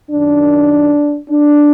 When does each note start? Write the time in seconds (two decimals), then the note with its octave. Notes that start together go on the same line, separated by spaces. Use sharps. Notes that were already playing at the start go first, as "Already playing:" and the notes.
0.10 F#2 D#3 D4
1.29 D4